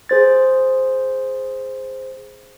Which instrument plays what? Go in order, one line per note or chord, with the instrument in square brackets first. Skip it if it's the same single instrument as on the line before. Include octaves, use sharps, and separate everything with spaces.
[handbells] G#4 C5 A6